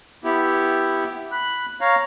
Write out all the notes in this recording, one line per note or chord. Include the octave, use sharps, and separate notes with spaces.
B3 E4 G4
B5 F#6
C#5 F5 A#5